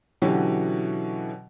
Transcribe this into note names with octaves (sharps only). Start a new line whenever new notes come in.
B2 D3 E3 F#3 C#4 G4